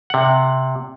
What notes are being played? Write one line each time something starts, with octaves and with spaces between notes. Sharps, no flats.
C3 F#5